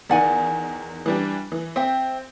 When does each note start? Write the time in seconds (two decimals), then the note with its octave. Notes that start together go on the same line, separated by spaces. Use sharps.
0.10 E2 D#3 A#3 D5 F#5 G#5
1.06 E3 G3 D4
1.52 E3
1.76 C4 E5 G5